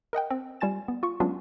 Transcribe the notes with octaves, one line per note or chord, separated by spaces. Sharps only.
A#4 D#5 F#5 G5
C4
G3 F4 G#5 A6 E7
B3
F4 C#6
F#3 G#3 B3 C#4 D4 F4